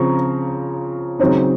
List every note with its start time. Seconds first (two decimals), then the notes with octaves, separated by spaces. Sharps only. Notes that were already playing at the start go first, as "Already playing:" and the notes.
Already playing: C#3 F3 C4 A#5 C#6
1.19 C#3 F#3 C4 D#4